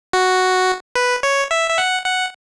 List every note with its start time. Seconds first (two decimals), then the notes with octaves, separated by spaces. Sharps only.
0.13 F#4
0.96 B4
1.23 C#5
1.51 E5
1.70 E5
1.78 F#5
2.05 F#5